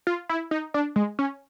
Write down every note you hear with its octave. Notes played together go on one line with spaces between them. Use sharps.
F4
E4
D#4
D4
G#3
C#4